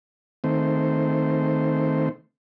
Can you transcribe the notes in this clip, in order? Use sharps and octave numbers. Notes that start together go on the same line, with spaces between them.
D#3 A3 C4 C5